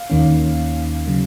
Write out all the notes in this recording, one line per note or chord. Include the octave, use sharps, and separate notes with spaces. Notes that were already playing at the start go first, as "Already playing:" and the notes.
Already playing: F5
D#2 D#3 A#3 C#4
C#3 F#3